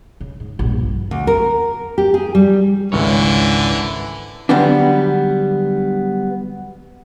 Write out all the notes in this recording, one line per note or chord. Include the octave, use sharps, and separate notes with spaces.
C#3
G#2
A#1 G2
F3
D2
A#4
G4
G#4
G3
G#1 C#2 D3 E3 C#5
D3 F#3 G3 B3 D4